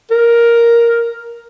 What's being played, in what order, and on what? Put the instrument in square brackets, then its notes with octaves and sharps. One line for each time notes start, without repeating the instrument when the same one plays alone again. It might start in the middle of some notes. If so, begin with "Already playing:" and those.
[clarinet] A#4